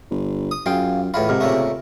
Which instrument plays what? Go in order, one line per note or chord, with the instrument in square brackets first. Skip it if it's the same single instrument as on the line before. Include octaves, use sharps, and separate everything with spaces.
[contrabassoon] G1
[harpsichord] D#6
[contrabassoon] F#2 [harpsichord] F4 [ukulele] G#4 F5 G5
[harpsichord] E2 A2 F4 [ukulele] B5
[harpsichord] G#2 [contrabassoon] C3 [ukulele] A#4
[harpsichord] A#2 C#3 A3